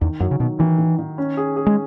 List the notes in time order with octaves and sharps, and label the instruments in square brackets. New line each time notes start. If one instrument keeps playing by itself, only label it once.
[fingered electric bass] E2 [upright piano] D#3
[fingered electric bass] F#2 [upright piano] F#3
[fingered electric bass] C#3
[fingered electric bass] B2 [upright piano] D#3
[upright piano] D#3 [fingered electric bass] E3
[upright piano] D#3
D#3
C#4
G#4
G#4
[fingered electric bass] G#3